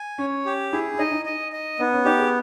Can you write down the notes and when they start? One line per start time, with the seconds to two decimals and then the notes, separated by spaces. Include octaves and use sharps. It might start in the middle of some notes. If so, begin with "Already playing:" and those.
Already playing: G#5
0.18 C#4 C#5
0.45 G4
0.73 E4 G#4
0.93 E4
0.99 D#4 D#5
1.12 D#4
1.25 D#5
1.52 D#5
1.79 B3 D#4
1.93 C#4
2.05 D#4 G4
2.19 G#4